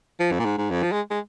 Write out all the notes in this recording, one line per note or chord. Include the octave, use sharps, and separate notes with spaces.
F3
F2
A#2
G#2
G#2
F2
F3
G#3
G#3